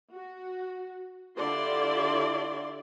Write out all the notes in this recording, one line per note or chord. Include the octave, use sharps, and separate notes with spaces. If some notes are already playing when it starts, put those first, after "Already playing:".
F#4
D3 E4 F4 G4 D5 C6